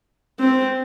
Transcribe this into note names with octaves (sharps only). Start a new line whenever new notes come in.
C4